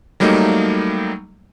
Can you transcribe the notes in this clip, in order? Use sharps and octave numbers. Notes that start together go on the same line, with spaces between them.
F#3 G3 A3 A#3 D#4